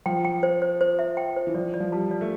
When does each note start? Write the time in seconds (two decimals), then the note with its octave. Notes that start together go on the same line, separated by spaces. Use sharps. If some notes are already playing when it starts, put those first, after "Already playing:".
0.06 F3 G5
0.25 G5
0.43 C5
0.62 C5
0.81 C5
0.99 E5
1.17 G5
1.36 C5
1.47 E3
1.54 F3 D5
1.74 D5
1.80 F3
1.92 G3 A5
2.11 D5
2.21 A3